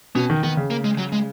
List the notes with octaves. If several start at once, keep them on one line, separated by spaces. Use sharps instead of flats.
B2 C#4
D#3
D#3 B3
C#3
A#3
G#3
F#3
G#3